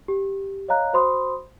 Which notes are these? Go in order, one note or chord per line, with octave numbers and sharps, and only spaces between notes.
G4
C#5 D#5 F5 A#5 F#6
F#4 C5 B5 C6 D#6